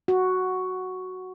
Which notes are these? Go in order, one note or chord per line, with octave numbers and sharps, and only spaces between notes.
F#4